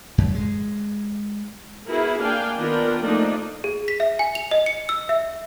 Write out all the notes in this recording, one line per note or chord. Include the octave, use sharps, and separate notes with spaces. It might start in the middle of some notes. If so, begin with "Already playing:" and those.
F#2
G#3
B3 E4 F#4 G#4 A#4
A#3 D4 F5 G5 G#5
D#3 B3 D4 F4 A#4 G5
F3 A3 A#3 D4 D#4
G#4
B6
E5
G#5
F7
D#5
C#7
E6
E5